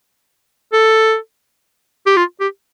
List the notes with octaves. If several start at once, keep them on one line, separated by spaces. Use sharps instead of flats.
A4
G4
F4
G4